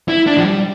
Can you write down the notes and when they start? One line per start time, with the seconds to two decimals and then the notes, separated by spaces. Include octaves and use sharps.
0.08 E4
0.27 D4
0.38 F3
0.45 G3